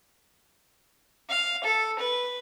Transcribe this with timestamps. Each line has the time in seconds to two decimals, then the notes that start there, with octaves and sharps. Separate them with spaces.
1.29 F5
1.64 A4
1.99 B4